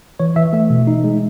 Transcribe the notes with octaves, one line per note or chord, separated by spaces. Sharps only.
E3 C#5
E3 E5
A3 E5
B2
D#4
G#3